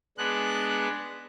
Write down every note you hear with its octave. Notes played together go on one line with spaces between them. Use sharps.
G#3 B3 D4 F#6